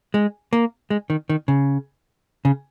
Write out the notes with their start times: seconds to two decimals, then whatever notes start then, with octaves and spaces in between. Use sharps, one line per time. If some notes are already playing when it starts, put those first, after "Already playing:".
0.14 G#3
0.53 A#3
0.90 G#3
1.10 D#3
1.29 D#3
1.48 C#3
2.45 C#3